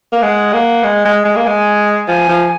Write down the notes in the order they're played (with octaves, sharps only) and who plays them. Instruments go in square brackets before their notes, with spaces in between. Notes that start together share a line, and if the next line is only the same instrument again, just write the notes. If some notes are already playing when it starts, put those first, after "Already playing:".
[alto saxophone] A#3
[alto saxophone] G#3 [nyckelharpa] F#5
[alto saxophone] A#3
G#3
G#3
G#3
A#3
[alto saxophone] G#3 [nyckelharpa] G#5
[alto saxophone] F3 [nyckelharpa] G#5
[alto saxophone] F3